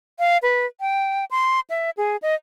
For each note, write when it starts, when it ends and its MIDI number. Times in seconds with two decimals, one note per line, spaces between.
0.19 0.37 77
0.43 0.66 71
0.80 1.25 79
1.31 1.60 84
1.70 1.90 76
1.97 2.16 68
2.22 2.35 75